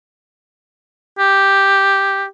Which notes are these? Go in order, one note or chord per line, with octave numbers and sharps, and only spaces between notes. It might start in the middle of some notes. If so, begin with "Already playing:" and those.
G4